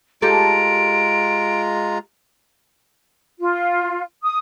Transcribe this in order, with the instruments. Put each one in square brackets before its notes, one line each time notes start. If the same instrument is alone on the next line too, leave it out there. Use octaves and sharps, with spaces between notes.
[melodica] G#3 F4 A#5 [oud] G4 A4 [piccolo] D7
[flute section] F4
D#6